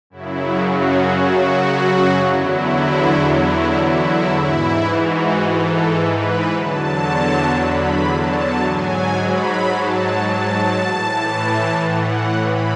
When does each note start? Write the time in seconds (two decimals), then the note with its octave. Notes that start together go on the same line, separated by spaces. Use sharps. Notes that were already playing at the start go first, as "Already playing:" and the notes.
0.10 F#2 C#3 F#3 E4
0.64 F#4
1.17 F#4
2.25 E2 D3 F#3 E4
3.31 E4
3.85 E4
4.39 G#2 E3 E4
4.92 F#4
5.46 A4
5.98 B4
6.53 E2 D3 F#3 A5
7.59 B5
8.12 A5
8.66 G#2 F#3 G#5
9.20 B5
9.73 A5
10.27 A5
10.81 A2 E3
11.87 F#5
12.40 B5